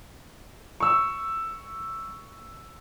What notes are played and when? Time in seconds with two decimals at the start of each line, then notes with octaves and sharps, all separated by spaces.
0.80 C#6 E6